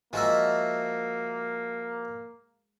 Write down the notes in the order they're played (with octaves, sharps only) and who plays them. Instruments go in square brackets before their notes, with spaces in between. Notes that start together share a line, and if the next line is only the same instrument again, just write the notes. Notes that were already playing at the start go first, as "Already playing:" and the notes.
[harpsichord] F3 F#4 E5 [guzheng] G#3 [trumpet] A#3